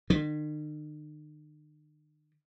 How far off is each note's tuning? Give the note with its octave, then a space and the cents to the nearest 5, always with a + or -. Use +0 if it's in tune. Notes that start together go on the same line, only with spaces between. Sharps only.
D#3 -45